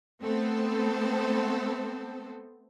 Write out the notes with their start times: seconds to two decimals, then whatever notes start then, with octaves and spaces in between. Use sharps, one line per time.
0.22 A3 B3 C4 A4 C5